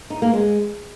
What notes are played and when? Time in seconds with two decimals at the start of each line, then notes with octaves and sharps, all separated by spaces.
0.10 D#4
0.22 A#3
0.34 G#3